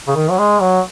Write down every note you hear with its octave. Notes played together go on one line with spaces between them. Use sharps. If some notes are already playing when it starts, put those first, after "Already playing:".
C#3
D#3
F#3
G#3
F#3